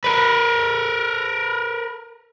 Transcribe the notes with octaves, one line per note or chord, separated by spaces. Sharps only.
A#4 B4